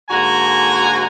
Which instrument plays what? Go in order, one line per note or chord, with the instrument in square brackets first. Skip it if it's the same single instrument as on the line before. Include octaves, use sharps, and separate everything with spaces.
[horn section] G#2 D3 A#3 F#4 G#5 A#5